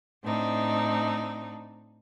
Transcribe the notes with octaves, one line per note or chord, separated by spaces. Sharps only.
A2 C4 D4 D#4